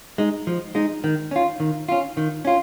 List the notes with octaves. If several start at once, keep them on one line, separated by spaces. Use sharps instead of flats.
G#3 D#4
F3
G#3 D#4
D#3
C#4 F4
D#3
C#4 F4
D#3
C#4 F4